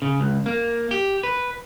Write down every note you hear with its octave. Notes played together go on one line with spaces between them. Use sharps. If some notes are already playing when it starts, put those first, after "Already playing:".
C#3
C#2
A#3
G4
B4